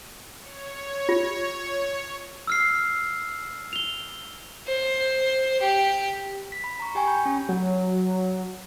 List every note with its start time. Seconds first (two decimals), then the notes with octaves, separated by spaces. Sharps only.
0.40 C#5
1.09 F4
2.47 E6 F6 C7
3.73 F7 G7
4.68 C5
5.61 G4
6.52 B6
6.64 B5
6.80 A#5 C#6
6.95 G4 G5 G#5 C#6
7.07 B5 G6
7.25 C#4
7.49 F#3